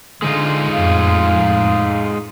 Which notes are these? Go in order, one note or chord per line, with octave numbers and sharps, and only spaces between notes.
D3 G#3 D#4 F4
F2 A2 F5